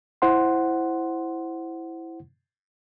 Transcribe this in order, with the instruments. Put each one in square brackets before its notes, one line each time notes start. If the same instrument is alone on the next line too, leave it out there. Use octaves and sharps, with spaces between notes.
[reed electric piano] E4 C5 F#5 C6